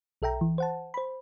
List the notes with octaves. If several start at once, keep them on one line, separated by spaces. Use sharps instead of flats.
B1 A4 E5 G5 A#5
E3
C5 F#5 A5
C5 B5